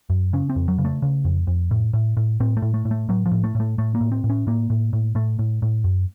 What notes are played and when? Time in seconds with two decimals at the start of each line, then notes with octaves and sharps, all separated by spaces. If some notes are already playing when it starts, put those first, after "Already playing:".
0.10 F#2
0.33 C#3 C#4
0.50 C4
0.56 F2
0.68 F#3
0.78 C#3
0.85 A3
1.02 C#3
1.25 F2
1.47 F2
1.71 A2
1.93 A2
2.17 A2
2.40 A2 C4
2.57 A3
2.62 A2
2.74 A3
2.85 A2
2.91 A3
3.09 A2 F#3
3.26 F3
3.31 A2
3.44 A3
3.55 A2
3.60 A3
3.78 A2 A3
3.95 A#3
4.01 A2
4.12 C4
4.24 A2
4.30 C#4
4.47 A2 A#3
4.70 A2
4.93 A2
5.15 A2 A3
5.39 A2
5.62 A2
5.84 F#2